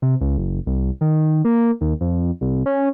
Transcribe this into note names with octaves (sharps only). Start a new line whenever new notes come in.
C3
C#2
F#1
C2
D#3
A#3
D#2
F2
C2
C#4